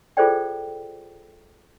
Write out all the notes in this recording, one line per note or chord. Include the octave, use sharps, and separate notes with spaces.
F4 G#4 A4 C5 D5 G5